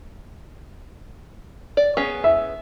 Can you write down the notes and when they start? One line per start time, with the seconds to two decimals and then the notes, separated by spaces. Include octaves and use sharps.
1.77 D5
1.97 B3 C#4 G#4
2.24 E5